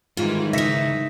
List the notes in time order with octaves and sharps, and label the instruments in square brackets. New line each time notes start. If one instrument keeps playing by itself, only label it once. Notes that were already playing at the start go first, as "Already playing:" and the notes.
[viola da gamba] G#2 D#3 E3 [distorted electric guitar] G3 [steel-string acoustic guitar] F4
[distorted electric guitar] C#2 [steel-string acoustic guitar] D#4 E5 [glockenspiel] A#6 B6 C#7